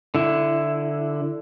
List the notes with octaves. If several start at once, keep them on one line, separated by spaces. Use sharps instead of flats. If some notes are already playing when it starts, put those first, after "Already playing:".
D3 E4